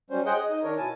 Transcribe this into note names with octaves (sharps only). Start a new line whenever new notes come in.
F#3 G3 C#4 C5
G#4 C5 D#5 F#5 G5
G#4 D#5
D#4 D#5
D#3 D4 A#4 C#5
B2 E4 G#5 A5